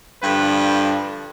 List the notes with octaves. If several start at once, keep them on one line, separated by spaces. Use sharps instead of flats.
G2 D3 F3 B4
B4